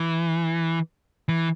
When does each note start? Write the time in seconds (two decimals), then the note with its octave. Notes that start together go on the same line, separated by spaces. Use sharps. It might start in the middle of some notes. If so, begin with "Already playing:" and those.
Already playing: E3
1.28 E3